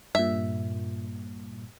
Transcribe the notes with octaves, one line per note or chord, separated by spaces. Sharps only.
G2 A#2 E5